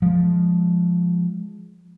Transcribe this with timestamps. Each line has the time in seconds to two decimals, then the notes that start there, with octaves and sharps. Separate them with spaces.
0.02 F3 G#3